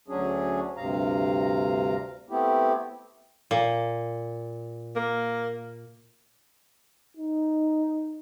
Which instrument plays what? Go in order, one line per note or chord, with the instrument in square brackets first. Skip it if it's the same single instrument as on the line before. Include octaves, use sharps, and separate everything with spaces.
[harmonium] D2 F#3 C#4 D4 G#4
D2 G2 C3 F5 A#5
A3 B3 C4 E4 G4
[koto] A#2
[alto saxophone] A#3
[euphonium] D#4